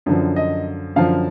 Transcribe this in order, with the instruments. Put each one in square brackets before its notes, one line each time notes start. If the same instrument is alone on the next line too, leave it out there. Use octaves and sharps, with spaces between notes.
[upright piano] F#2 D3 F3
D#5
F#2 D3 F3 F5